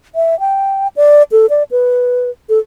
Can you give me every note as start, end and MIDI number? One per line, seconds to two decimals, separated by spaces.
0.15 0.38 76
0.40 0.88 79
0.96 1.23 74
1.32 1.46 69
1.50 1.63 74
1.71 2.30 71
2.49 2.59 69